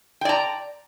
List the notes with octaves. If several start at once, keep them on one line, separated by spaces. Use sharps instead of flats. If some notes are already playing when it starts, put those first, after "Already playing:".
D5 G5 A#5